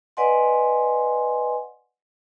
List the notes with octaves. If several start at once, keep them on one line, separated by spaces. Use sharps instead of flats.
B4 D5 D#5 F#5 G#5 C6